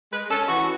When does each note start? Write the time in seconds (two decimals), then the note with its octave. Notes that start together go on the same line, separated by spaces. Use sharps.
0.12 G#3 B4
0.30 C#4 A4
0.49 E3 F#4